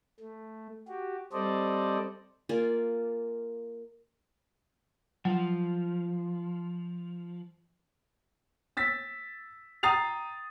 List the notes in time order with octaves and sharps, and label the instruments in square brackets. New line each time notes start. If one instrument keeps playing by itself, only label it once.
[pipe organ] A3
F#4 G4
G3 C4 A4 C5 D5 D#5
[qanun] A#3 F4 D5 G#5
[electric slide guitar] F3 [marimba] F#3
[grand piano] E6 A6 B6
G5 A#5 D#6 A6 C7 F7